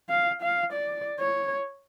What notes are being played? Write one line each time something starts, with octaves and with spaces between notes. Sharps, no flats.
F5
F5
D5
C#5